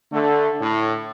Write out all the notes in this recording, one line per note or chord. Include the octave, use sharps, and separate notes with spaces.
D3 A3
A2